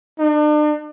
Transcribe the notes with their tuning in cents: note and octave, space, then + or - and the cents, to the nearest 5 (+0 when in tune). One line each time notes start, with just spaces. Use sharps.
D4 +40